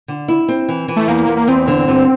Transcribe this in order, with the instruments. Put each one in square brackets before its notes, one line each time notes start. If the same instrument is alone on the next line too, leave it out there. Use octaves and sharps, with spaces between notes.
[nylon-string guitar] D3
E4
C4
E3
E3
[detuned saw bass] A3
[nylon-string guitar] E2 [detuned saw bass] A#3
[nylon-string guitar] E2
[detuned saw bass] A#3
[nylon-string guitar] E2 [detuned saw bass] C4
[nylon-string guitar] D3
[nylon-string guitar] G2 [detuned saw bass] C4